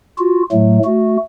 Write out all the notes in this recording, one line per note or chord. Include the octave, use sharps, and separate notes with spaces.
F4 F#4
A2 F#3 A3
A3 F#4